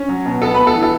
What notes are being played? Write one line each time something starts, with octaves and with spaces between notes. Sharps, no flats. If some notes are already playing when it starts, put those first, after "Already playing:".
Already playing: C#4
F#3
B2
B3 A4 A5
B4 B5
B3
A4 A5
E3
A4